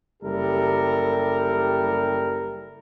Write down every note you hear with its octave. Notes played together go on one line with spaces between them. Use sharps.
F#1 G3 E4 G4 A4 A#4